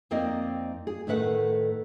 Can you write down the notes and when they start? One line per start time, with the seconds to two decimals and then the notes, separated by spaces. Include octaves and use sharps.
0.11 F2 A#3 C4 D#4 D5 D#5
0.87 G#4
1.07 A2 D#3 A3 B4 D#5 F#5